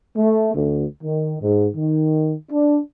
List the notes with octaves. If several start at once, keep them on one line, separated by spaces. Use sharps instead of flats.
A3
D2
D#3
G#2
D#3
D4